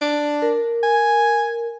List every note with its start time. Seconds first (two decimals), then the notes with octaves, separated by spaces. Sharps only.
0.01 D4
0.42 A#4
0.83 G#5